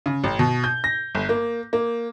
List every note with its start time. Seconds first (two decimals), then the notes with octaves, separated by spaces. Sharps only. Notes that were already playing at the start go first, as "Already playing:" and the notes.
0.06 C#3
0.24 A1
0.39 B2
0.64 G6
0.84 A#6
1.15 G1
1.29 A#3
1.73 A#3